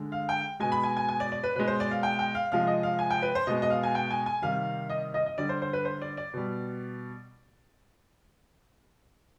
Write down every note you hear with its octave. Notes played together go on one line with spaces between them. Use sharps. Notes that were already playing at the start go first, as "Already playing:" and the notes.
Already playing: D3 G#3
F5
G5
B2 G#3 G#5
B5
G#5
G#5
G#5
D5
D5
B4
B2 G#3 B4
C5
D5
F5
G5
G5
F5
C3 F3 G#3 F5
D#5
F5
G#5
G5
B4
C5
B2 G#3 D#5
D#5
F5
G#5
G5
G#5
G#5
C3 D#3 G3 F5
D#5
D#5
D#5
D3 G3 D5
C5
C5
B4
C5
D5
D5
B2 G3